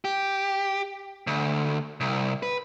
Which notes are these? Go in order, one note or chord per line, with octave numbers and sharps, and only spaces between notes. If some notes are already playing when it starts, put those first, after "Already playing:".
G4
D2
C2
B4